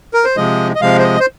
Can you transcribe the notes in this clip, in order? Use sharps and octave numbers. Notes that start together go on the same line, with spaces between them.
A#4
C5
C3 F3 G#3 D#5
D#5
C3 F3 G#3 F5
C5
D#5
C5